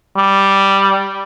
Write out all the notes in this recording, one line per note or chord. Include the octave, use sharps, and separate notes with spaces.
G3